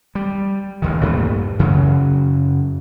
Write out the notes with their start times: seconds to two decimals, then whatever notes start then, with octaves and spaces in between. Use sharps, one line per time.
0.15 G3
0.82 A1 D#2 D#3
1.03 G2 A#2 A3
1.59 F#2 C#3 F#3